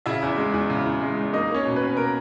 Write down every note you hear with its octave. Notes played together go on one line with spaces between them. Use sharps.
C#3 E4 E5
E2
G#3
E2
C#3
E2
G#3
E2
A#3 D#4 D#5
A#3 C#4 C#5
B2
B2 B4
A#3 A#4